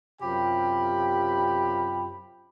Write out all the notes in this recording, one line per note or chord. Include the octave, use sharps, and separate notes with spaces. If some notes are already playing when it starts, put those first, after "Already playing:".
F#2 C3 F4 G4 G5 B5